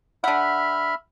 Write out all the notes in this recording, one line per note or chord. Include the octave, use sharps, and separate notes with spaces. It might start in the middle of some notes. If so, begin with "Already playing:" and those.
D3 E5 F#5 B5 F6